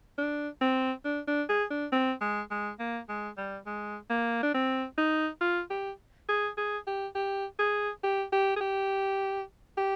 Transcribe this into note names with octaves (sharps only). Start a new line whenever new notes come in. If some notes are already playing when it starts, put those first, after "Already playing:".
D4
C4
D4
D4
G#4
D4
C4
G#3
G#3
A#3
G#3
G3
G#3
A#3
D4
C4
D#4
F4
G4
G#4
G#4
G4
G4
G#4
G4
G4
G#4
G4
G4